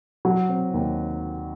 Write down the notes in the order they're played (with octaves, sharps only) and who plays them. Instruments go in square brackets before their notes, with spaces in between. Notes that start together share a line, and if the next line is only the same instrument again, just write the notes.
[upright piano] F#3
C4
D#2